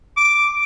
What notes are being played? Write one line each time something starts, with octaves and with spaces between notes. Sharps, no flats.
D6